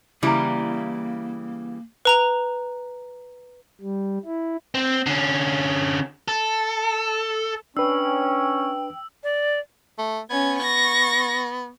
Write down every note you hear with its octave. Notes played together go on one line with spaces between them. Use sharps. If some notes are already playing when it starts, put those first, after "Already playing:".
C#3 E3 G3 A#3 E4 A#5
B4 A#5 F7
G3
E4
C4
D3 C#4
A4
C#4 D4 B4 G5 E6
D5
A3
B3 C#4 G#6
C#6 A#6